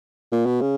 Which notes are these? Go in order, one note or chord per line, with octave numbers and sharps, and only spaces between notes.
A#2
B2
C#3